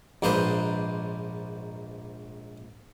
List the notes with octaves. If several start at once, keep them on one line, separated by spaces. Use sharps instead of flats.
A#1 G#2 A#3 B4 C5 D#5